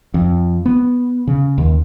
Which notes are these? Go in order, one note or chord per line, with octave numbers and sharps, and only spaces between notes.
F2
B3
C#3
D#2